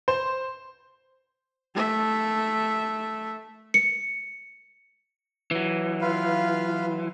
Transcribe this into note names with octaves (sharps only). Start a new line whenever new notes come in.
C5
A3 E5
C#7
E3 F#3
F4 B4 F5